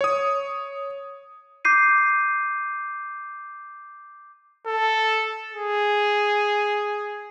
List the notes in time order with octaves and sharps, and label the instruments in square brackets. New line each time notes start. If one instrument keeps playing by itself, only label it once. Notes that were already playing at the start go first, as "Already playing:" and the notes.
[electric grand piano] C#5 D#6
[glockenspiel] D6 G6 C7 D#7
[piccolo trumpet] A4
G#4